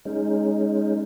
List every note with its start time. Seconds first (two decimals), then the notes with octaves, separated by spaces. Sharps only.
0.05 G#3 C#4 D#4